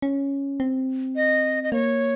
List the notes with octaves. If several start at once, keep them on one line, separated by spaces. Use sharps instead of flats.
C#4
C4
D#5
D#5
A#3 C#5